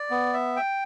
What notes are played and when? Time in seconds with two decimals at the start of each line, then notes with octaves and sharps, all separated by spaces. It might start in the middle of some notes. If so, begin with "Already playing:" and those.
Already playing: D5
0.10 B3
0.34 E5
0.56 G5